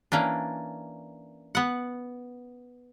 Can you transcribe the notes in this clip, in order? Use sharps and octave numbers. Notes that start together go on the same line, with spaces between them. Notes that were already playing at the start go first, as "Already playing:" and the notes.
E3 A#3 C#4 D4
B3 F#5